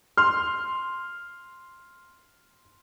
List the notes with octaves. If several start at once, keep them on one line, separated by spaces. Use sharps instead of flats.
C6 F6